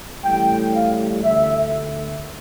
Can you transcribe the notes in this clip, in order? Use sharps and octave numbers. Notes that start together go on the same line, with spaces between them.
A1 A2 G3 G5
F5
D2 D3 A3 E5